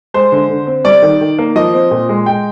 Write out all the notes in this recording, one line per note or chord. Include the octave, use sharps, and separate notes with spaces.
G#3 C5
D3
D3
C4
G3 D5
D#3
D#3
A#3
F3 D#5
C4
A#2
G#3
G#3 G5